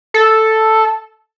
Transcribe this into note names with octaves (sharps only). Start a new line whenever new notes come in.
A4